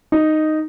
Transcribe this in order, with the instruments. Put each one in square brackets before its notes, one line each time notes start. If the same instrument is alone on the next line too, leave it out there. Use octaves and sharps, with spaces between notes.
[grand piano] D#4